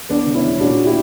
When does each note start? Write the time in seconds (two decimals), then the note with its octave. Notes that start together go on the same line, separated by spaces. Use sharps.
0.09 E2 B3 D4
0.26 E1
0.35 C#4 E4
0.44 E1
0.60 A#2 D4 F#4
0.86 E4 G4